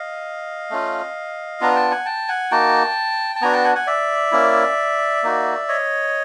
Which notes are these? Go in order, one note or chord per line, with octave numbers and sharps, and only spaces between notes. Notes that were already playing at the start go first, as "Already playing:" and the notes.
Already playing: D#5 F5
A3 C#4 F4
B3 D4 F4 A#5
G5 A5
F#5 G#5
G5 A5
F#5 G#5
A#3 D#4 F#4 G5 A5
A5
B3 D4 F#4 G#5 A#5
G5 A5
F#5 G#5
F#5 G#5
D5 E5
A#3 C#4 E4
A#3 D#4 F#4
C#5 D#5